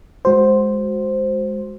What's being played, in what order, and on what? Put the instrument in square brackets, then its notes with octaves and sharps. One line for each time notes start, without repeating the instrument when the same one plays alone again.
[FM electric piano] G#3 F#4 C5